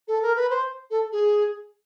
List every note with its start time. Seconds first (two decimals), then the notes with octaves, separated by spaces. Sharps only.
0.08 A4
0.22 A#4
0.36 B4
0.50 C5
0.91 A4
1.12 G#4